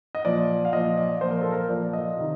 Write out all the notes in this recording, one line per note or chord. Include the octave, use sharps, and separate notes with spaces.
D#5
A#2 F3 D5
F5
A#2 F3 D#5
D5
A#2 F3 C5
A#4
A4
A#4
A#2 F3 D5
D#5
C3 D#3